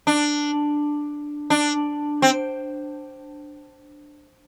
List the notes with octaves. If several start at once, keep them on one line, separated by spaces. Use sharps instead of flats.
D4
D4
C4